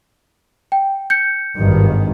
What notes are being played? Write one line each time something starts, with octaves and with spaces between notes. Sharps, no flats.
G5
G6 C#7
G#1 G2 D#3